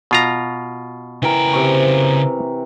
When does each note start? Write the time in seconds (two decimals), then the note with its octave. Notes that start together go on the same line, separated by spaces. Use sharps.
0.11 B2 F4 A#5
1.22 C#3 E3 A#4 G5
1.53 C3 C#6